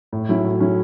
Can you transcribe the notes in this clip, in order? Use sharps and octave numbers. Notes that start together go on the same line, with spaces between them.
A2
F#3 C#4 E4
A2
F#3 C#4 E4